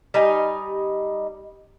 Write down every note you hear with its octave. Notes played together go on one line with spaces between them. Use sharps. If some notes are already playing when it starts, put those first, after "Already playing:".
G3 D#4 D#5 G#5